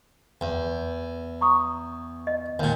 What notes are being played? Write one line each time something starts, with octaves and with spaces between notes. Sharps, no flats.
E2
A#5 C#6 D#6
D#5
D#2 A#2